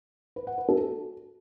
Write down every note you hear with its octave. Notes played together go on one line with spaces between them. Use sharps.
B4
F#5
B4
A4
F#4